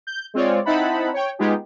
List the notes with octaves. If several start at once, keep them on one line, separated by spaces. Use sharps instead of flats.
G6
G#3 C4 F4 C#5 D5
C4 D#4 E4 F#5 A5 B5
C#5 G5
G#3 B3 D#4 F4 G4 G#4